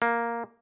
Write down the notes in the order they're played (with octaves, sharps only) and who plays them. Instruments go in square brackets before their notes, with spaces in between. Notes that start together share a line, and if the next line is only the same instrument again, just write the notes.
[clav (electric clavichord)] A#3